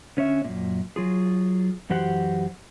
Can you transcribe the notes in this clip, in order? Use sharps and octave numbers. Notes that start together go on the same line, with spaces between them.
D3 C#4 C#5 E5
F#2 A#2
F#3 F4 G#4
F#2 E3 F#4 G4 C5 F#5